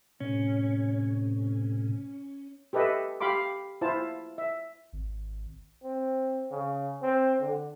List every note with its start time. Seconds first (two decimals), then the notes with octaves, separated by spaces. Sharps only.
0.20 A2 C3 C#4
2.73 G4 A4 B4 D#5 E5
3.20 G4 F5 B5 C6 D6
3.81 E4 F4 C5 A5
4.38 E5
4.93 G#1
5.83 C4
6.51 C#3
7.02 C4
7.41 D3